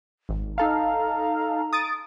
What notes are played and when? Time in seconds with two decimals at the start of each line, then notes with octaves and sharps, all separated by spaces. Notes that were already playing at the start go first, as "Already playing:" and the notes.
0.29 G#1
0.58 D#4 A4 F5 A#5
1.73 D#6 A6 D7